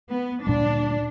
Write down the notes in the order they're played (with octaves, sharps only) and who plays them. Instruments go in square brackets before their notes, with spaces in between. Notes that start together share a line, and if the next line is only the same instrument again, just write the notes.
[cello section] B3
[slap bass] D2 A#2 G3 [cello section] D4